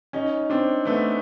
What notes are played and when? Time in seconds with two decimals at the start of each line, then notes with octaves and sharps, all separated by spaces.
0.13 C#4 D#4
0.50 C4 D4
0.85 A3 B3